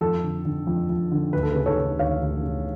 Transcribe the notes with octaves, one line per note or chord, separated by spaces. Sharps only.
F2 A4
D3
D3
F2
F2
D3
D2 B4
A4
C#3 B4
A4 C#5
C#3
D2 C#5 F5
D2
C#3